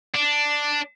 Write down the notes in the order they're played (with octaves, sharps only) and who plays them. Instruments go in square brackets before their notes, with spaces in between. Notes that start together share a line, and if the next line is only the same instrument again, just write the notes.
[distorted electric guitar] D4